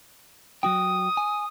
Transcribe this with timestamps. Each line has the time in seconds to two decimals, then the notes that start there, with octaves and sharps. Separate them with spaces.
0.63 F#3 F#4 G5 D#6
1.17 G#5